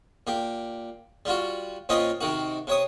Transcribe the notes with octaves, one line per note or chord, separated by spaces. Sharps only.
A#2 G4
G3 F4 F#4
A#2 C4 C#4 F4 D#5
C3 D#3 F#4
C3 C#5 D#6